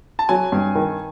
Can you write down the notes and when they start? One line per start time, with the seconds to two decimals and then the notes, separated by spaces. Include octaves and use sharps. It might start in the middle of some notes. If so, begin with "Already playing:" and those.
0.19 A5
0.29 F#3 G#5
0.52 G2
0.75 D#3